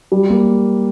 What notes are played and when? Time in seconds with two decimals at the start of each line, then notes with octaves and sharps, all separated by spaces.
0.12 G3
0.30 A#3